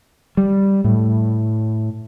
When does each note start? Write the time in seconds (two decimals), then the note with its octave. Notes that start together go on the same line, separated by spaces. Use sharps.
0.37 G3
0.84 A2